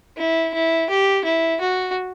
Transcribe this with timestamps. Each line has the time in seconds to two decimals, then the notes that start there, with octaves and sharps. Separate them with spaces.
0.17 E4
0.54 E4
0.89 G4
1.25 E4
1.61 F#4